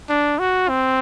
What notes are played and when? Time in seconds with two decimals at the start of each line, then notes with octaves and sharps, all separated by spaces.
0.10 D4
0.39 F#4
0.69 C4